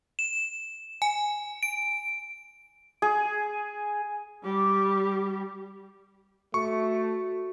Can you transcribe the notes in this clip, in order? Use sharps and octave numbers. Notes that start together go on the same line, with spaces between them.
E7
G#5
D7
G#4
G3 G4
A3 F#4 C#6